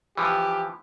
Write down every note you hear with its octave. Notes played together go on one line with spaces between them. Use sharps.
E3 F3 G4